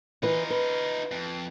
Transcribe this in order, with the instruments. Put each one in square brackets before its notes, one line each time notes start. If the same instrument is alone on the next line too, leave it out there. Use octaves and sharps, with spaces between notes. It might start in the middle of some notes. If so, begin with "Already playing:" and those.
[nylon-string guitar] E3 B4 [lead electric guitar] D#4 F4
[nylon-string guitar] B4
[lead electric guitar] F2